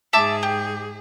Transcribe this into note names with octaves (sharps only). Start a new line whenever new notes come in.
G#2 G#4 E5 A5 D6
G4